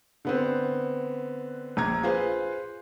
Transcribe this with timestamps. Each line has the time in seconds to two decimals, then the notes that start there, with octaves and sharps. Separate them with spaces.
0.25 D3 B3 C4
1.77 A#1 A#5 G#6
2.03 F4 G#4 B4 C5 F5